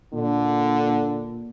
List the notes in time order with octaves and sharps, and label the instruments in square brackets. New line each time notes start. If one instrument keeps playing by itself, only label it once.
[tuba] A#2 [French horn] D3